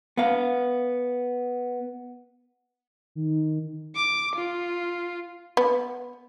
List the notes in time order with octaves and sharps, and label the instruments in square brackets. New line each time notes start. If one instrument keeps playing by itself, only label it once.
[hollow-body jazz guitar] B3 F5
[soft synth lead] D#3
[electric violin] D6
F4
[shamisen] B3